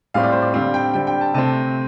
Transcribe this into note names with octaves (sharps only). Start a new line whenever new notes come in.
A2 G3 C4 F5
D5
C5
D5
D3 G3 C4 F5
G5
D3 G3 C4 G5
G5
A5
C3 A3 C4 A5